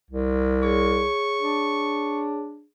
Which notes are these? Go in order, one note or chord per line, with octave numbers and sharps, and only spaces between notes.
C2
G#4 C#5 C#6
D4